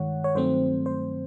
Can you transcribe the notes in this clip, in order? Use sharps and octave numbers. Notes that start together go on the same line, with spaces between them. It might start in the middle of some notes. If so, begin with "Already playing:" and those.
Already playing: G2 D#3 G#3 C#5 F#5
C#5
G2 D#3 F#3 A3 C4 C5
C5